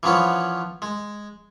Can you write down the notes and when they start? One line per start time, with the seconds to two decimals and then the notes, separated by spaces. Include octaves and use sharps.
0.03 E3 F3 B3 C#4 C#5
0.82 G#3